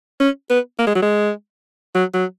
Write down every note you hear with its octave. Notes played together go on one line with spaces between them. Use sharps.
C#4
B3
A#3
G#3
F#3
G#3
F#3
F#3